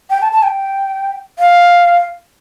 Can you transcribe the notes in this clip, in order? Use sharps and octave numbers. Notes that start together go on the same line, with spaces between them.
G5
A5
A5
G5
F5